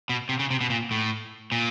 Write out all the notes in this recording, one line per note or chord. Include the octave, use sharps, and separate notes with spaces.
B2
C3
C#3
C3
B2
A#2
A2
A#2